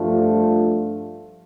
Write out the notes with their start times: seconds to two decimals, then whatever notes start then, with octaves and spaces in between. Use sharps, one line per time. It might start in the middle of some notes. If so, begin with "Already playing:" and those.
Already playing: G2 F3 A3 D4 F4